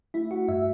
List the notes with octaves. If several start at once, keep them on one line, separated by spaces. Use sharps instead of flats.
A3 E4
F#4
G2 E5